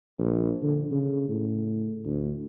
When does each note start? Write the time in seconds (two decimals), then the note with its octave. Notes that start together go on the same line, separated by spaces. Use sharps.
0.19 A#1
0.63 D3
0.91 C#3
1.29 A2
2.05 D2